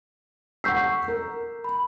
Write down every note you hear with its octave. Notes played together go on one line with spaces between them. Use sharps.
F#5 C#6 E6 G6 B6 C7
A#4
B5